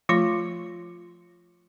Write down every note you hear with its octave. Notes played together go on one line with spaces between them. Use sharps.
F3 A3 F4 C6